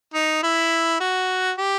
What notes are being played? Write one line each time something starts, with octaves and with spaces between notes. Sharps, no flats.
D#4
E4
F#4
G4